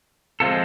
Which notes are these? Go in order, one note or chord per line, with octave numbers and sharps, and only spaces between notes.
F3 G#3 C4 F4 A4